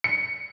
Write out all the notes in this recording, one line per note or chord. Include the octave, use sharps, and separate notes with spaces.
C#7